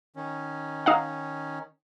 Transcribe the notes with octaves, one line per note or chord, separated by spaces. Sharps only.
D#3 C#4
D#4 F5 F#5